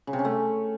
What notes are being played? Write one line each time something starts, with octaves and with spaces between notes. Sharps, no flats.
C#3
C3
C#4
A3